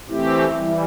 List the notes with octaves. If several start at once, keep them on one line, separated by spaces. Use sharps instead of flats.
E3 A3 C4 E4 G4
E3 G3